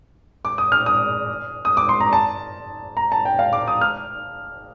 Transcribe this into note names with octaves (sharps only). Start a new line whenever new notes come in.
D6
D#6
F6
D#6
D#6
D6
C6
A#5
A5
A#5
A5
G5
F5
D6
D#6
F6